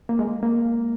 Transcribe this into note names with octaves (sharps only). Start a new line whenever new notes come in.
A#3
G#3
A#3